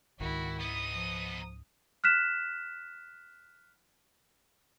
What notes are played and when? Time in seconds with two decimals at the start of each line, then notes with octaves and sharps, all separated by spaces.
0.20 C#2 G#2 D#3 E4 F#4
0.61 B3 D#4 D#6
0.94 F3
2.04 F6 F#6 B6 E7